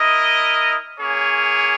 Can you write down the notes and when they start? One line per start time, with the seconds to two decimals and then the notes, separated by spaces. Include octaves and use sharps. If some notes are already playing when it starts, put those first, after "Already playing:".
Already playing: E4 A#4 D#5
0.99 A#3 C#4 G#4 C#5